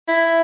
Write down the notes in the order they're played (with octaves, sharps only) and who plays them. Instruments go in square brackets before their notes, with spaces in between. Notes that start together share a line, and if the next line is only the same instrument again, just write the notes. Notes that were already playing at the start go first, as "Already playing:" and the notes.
[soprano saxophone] E4